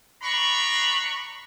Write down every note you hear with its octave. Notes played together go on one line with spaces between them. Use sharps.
D4 A#5 B5 C#6